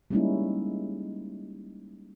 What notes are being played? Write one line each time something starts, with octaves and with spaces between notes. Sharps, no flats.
G3 G#3 A#3 C#4 D#4 E4